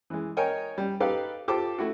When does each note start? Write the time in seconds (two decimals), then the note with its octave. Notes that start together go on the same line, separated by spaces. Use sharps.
0.10 E3 G#3
0.37 A#4 C#5 D#5 G5 G#5
0.78 G3
1.00 D#4 G4 A4 B4 F5
1.48 F4 G4 A4 C5 A5 D6
1.78 A3 E4 F#4